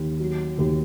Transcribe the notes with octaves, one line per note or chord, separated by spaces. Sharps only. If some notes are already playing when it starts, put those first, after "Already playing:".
Already playing: D#2
F#3
D#2